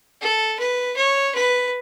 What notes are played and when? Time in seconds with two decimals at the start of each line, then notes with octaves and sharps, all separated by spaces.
0.21 A4
0.59 B4
0.97 C#5
1.35 B4